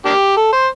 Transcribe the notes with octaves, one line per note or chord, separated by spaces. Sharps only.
A#3 D4 G4
A4
C5